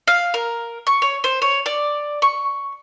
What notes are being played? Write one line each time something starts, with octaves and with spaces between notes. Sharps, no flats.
F5
A#4
C#6
C#5
C5
C#5
D5
C#6